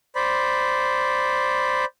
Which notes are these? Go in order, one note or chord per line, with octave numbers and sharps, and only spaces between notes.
C5 D5 B5